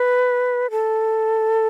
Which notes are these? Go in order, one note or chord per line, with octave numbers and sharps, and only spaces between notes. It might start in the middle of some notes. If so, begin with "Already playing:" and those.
Already playing: B4
A4